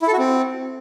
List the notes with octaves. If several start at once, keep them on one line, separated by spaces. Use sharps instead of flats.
E4
A4
F#4
C4